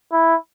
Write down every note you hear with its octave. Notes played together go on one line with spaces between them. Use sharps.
E4